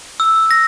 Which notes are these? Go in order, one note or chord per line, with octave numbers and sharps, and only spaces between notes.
E6
A#6